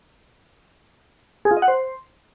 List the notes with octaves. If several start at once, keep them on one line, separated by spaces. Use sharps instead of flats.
G#4
F4
D#5
F#5
C5